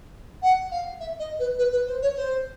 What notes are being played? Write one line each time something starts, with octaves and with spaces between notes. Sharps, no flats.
F#5
F5
E5
D#5
B4
B4
B4
C5
C#5
C5